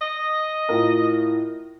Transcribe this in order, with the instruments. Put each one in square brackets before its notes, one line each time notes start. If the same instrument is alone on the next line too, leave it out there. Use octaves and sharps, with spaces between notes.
[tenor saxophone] D#5
[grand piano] A2 F4 A#4